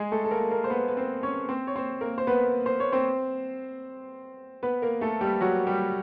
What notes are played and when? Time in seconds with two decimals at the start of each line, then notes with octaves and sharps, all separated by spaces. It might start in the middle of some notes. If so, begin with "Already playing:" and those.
Already playing: G#3 G#4
0.12 A3 A4
0.25 A4
0.31 A#3 A#4
0.51 A#3 A#4
0.64 C5
0.70 B3 B4
0.88 B4
0.97 C4 C5
1.23 C#4 C#5
1.49 C4 C5
1.67 C#5
1.76 C4 C5
2.01 A#3 A#4
2.18 C5
2.27 B3 B4
2.66 C5
2.80 C#5
2.92 C4 C5
4.63 B3 B4
4.82 A#3 A#4
5.01 A3 A4
5.21 G3 G4
5.41 F#3 F#4
5.67 G3 G4